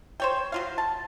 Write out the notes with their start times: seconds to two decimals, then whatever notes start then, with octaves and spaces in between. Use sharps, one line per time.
0.20 C5 C#5 G5
0.52 F#3 F4 F5
0.78 A5